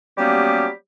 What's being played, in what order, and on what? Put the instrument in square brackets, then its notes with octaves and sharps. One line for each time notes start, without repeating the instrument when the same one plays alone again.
[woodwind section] F#3 G3 A#3 B3 C#4 G4